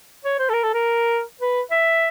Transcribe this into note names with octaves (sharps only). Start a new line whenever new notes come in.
C#5
C5
A4
A#4
A4
A#4
B4
E5